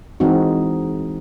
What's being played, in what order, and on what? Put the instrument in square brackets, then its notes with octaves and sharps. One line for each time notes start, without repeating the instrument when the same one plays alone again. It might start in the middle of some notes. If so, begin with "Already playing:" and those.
[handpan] E3 G#3 C4 D#4 F#4